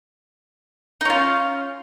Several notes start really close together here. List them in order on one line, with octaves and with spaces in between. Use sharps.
D#4 C#4 F4